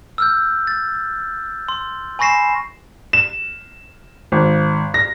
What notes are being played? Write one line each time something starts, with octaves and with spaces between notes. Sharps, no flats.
E6 F6 G6
A6
C6
G#5 B5 C#6 A#6 C7 E7
E7
G#1
A#6